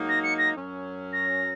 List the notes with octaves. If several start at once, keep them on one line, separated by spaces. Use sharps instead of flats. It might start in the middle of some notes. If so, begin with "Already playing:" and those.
Already playing: G#2 F#3 A#3 D#4
A#6
C#7
A#6
F#2 F#3 C#4
A#6